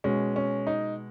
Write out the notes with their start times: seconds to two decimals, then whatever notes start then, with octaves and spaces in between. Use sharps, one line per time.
0.04 B2 G#3 C#4
0.36 C#4
0.67 D#4